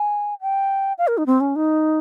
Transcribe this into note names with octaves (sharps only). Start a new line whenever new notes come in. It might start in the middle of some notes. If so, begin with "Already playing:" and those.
Already playing: G#5
G5
F5
A#4
D#4
C4
C#4
D#4